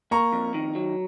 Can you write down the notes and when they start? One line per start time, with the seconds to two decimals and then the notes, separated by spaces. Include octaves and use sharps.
0.11 A#3 A#5 C#6
0.33 F2
0.54 D#3
0.75 F#3